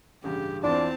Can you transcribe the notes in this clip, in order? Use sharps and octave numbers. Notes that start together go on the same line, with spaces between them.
A1 G2 C#3 G4
E2 E3 C4 D4 F4 A5